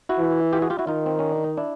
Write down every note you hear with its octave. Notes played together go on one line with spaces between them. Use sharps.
E4 F#4
E3
F4 G4
F#4 G#4
F4 G4
E4 F#4
D#3 D#4 F4
C4
C#4
D4
D#4
D4 E4